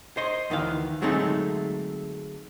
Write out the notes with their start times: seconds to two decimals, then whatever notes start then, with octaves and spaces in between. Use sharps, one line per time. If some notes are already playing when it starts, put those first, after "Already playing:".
0.17 C5 D#5 C6
0.50 D2 D#3 E3 F5
1.01 D3 F#3 G#3 A3 C4 D#4